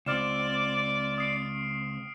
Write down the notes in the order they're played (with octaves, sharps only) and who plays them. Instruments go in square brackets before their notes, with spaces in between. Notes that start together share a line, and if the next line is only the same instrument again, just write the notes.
[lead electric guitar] C#2 C4 [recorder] D5 [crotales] F6 E7
[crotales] D#6 C7 D7